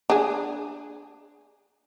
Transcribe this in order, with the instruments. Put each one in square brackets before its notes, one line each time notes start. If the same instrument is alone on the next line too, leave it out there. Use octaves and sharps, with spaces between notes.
[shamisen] D4 G#4